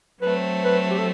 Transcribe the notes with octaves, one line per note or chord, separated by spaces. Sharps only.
F#3 A3 C4 B4
B4
G4
A4